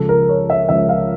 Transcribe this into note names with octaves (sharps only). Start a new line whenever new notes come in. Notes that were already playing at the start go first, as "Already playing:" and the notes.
Already playing: C#2 C#3 F3 A4
A#4
C#5
E5
C#2 C#3 F3 E5
F5